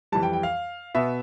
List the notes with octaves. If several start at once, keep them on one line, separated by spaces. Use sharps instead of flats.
F2 E3 G3 A5
G5
G5
F5
B2 B3 E5